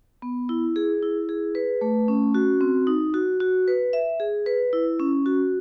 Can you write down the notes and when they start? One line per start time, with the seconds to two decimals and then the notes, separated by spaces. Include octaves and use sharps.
0.22 B3
0.49 E4
0.76 G#4
1.03 E4
1.29 G#4
1.55 B4
1.81 A3
2.08 C#4
2.34 F#4
2.61 C4
2.87 D#4
3.14 F#4
3.40 F#4
3.68 B4
3.93 E5
4.20 G#4
4.46 B4
4.73 E4
5.00 C#4
5.26 F#4